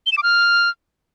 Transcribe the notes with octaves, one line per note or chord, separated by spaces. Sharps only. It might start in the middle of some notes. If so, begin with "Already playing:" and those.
G7
E7
D6
F6